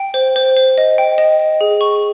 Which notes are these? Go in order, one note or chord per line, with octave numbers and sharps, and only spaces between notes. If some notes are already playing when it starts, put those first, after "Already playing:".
Already playing: G5
C5
C5
C5
D#5
G5
D#5
D#5
G#4
C#6